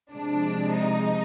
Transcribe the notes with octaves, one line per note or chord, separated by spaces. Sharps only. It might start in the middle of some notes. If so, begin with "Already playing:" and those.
C3 F3 G#3 D4
D#4